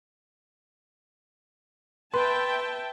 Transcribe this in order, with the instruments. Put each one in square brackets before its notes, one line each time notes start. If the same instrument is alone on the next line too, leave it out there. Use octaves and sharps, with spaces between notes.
[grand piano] B4 [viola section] E5 G5 A5 [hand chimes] C6